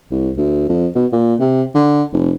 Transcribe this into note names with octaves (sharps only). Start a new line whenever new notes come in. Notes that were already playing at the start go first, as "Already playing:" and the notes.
C2
D2
F2
B2
A#2
C3
D3
F1